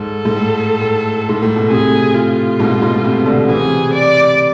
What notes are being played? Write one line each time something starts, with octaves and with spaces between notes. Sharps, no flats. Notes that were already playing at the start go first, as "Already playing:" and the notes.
Already playing: G#2 A4
G#2
A2
A2
G#2
A2
B2
A2 C3 G#4
F4
G#2 B2
G#2 B2
A2 C3
B2 D3
C3 E3 G#4
D5